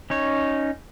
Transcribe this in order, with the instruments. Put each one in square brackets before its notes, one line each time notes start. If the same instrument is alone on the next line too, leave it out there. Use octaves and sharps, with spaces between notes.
[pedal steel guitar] C#4 D#4 C#5